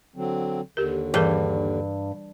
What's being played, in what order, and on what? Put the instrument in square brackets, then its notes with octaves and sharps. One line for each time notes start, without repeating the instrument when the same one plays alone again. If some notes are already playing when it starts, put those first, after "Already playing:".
[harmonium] D3 F#3 C4
[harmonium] D#2 D3 [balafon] G4 A#4
[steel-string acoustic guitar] G2 [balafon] E3 G#4 A#4